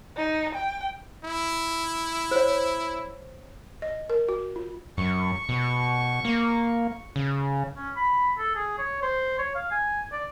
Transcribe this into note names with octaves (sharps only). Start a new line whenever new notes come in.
D#4
G5
E4
C5 C#5
D#5
A#4
F#4
F4
F#2 C#6
B2
A#3
C#3
C#4
B5
A4
G#4
C#5
C5
C#5
F5
G#5
D5